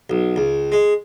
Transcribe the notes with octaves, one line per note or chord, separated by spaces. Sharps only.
B1
C#2
G#3